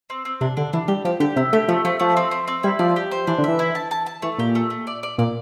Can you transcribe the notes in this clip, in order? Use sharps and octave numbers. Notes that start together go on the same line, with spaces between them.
C4
C4
C3 D4
D3 D4
E3 D4
G3 G4
F3 G4
D3 G4
C3 E4
A3 G4
F3 A3
F3 A3
F3 A3
C4
C4
C4
G3 E4
F3 D5
G4
C5
E3 D4
D3
E3 E5
E4
A5
A5
A5
E3 A3
A#2 G4
A3
A3
D5
D5
A#2 D5